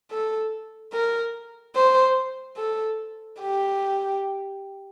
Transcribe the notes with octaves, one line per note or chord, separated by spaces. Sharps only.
A4
A#4
C5
A4
G4